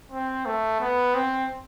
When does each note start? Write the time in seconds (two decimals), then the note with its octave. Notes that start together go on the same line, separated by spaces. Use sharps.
0.12 C4
0.46 A3
0.80 B3
1.15 C4